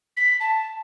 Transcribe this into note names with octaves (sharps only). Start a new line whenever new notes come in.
B6
A5